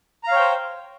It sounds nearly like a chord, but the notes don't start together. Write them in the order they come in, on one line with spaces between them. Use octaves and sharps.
A#5 F5 C#5 G5 C5